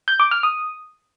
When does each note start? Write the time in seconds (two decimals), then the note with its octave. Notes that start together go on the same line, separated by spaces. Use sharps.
0.08 G6
0.20 D6
0.31 F6
0.43 D#6